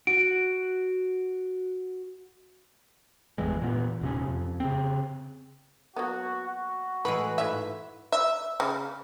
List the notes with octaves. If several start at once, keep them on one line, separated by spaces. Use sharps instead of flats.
F#4 D7
G1 E2 E3 G#3
A#2 E3 B3
D#1 C3 C#4
F2
C#3 C4
F#3 A#3 B3 F#4
F#4
A2 E3 G#3 B4
G#2 E4 B4 E5
E5
C#3